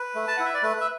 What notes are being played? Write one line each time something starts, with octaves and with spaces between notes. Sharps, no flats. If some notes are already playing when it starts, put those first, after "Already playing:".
Already playing: B4
A3
A5
E4 F#5
E5
D5
A3 B4
E5